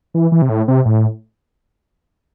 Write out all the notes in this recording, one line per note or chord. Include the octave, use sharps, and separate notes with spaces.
E3
E3
C3
A2
C3
A2